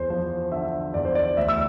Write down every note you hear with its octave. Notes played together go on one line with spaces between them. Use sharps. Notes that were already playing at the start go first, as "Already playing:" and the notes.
Already playing: E2 C5
F3 C5
D3 E5
E2 D5
C5
D5
D2 E5
E6